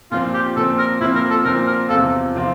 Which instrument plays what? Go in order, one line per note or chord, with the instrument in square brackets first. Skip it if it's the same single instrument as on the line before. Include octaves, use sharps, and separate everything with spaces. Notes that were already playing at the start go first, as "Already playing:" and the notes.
[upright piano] A#2 F3 C4 [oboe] F4
[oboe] G4
[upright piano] A#2 F3 C4 [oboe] A4
[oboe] A#4
[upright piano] A#2 F3 C4 [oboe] E4
[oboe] A#4
A4
[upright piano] A#2 F3 C4 [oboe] A#4
[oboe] A#4
[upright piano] E2 C3 F3 C4 F4 [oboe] A4
[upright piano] C3 F3 C4 F4